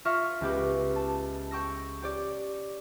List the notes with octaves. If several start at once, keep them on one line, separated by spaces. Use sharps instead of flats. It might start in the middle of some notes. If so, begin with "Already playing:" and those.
F4 E5 C#6 F6 A#6
C#2 B3 G4 B4 D6
A5
G5 C#6 E6 A#6
G4 C#5 D5